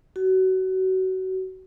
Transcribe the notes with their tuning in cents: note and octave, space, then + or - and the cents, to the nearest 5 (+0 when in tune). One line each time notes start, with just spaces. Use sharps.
F#4 +25